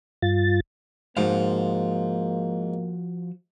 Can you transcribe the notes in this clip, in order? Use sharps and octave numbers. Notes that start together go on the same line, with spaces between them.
G2 F4 A6
G#2 F3 A#3 F#4 F5